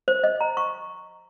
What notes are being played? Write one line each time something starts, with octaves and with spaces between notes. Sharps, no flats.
C5
D#5
A#5
C#6